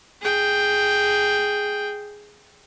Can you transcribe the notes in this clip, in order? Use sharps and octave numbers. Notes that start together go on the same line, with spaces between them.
G#4 G5